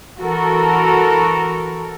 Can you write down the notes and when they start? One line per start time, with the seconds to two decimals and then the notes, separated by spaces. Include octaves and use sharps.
0.20 E3 F#4 A4 A#4